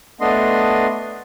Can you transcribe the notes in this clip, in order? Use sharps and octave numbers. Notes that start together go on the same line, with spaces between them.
A3 B3 D4 D#5 C6